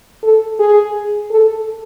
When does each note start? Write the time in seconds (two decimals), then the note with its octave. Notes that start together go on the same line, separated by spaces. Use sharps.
0.23 A4
0.59 G#4
1.31 A4